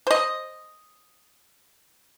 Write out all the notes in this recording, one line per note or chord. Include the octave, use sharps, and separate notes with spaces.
C5 D#5